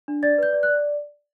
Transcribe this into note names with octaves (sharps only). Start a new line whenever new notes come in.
D4
D5 A6
B4 G6
D5
F#6
D5